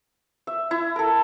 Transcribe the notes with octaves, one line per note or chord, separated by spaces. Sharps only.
E5
E4
A4 A#4